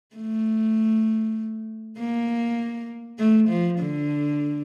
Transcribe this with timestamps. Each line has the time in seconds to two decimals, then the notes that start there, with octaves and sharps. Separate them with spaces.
0.16 A3
1.98 A#3
3.19 A3
3.49 F3
3.80 D3